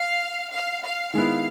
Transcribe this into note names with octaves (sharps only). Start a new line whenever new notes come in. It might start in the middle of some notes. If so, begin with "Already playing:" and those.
Already playing: F5
F5
F5
D#3 G#3 B3 E4 F5